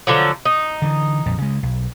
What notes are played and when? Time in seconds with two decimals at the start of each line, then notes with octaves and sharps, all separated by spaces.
0.07 D3 F3 F#3
0.45 D#4
0.82 D3 E3
1.26 A#1 F2 A#2
1.38 C#3 G#3
1.63 B1